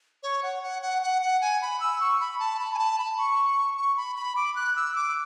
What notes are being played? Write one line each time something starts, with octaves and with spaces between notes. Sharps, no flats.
C#5
F#5
F#5
F#5
F#5
F#5
G#5
B5
E6
C#6
B5
A5
B5
G#5
A5
B5
C#6
C#6
B5
B5
D6
F#6
E6
D6